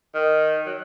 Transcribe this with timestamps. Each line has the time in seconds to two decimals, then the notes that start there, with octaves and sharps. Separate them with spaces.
0.14 D#3
0.66 F#3